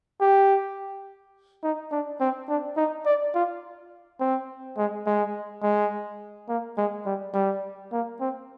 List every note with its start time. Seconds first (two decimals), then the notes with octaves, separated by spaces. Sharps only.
0.21 G4
1.64 D#4
1.92 D4
2.21 C4
2.49 D4
2.77 D#4
3.06 D5
3.35 F4
4.20 C4
4.77 G#3
5.06 G#3
5.63 G#3
6.49 A#3
6.78 G#3
7.06 G3
7.34 G3
7.92 A#3
8.21 C4